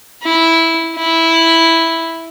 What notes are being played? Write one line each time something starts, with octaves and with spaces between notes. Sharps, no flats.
E4
E4